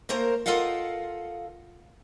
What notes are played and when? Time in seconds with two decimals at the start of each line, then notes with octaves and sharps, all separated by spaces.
0.09 A3 A#3 A#4 C5 A#5
0.46 F4 A4 A#4 D#5 F5 F#5